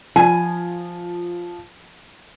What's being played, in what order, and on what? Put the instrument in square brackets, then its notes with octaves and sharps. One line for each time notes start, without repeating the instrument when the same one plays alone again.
[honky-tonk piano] F3 [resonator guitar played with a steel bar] G#5